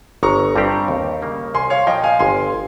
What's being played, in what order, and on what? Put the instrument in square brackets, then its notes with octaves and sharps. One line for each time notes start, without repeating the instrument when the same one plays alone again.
[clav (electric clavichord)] G1 [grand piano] A#5 C#6
[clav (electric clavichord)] G2 G3 C4 G4
D#2
C#3 G3 A#3 D#4
[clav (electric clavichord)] C2 [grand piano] G#5 C6
[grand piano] C#5 F5
[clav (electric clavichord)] A#2 F3 [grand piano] D#5 G5
[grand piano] F5 G#5
[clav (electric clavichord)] G1 [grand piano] G#5 C6